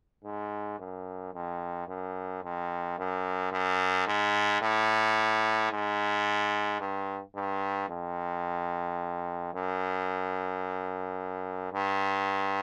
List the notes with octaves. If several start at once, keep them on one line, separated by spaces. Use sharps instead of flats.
G#2
F#2
F2
F#2
F2
F#2
F#2
G#2
A2
G#2
G2
G2
F2
F#2
G2